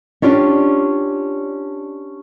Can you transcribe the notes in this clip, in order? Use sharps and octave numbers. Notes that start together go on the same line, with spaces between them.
C#4 D4 F4 G4 D5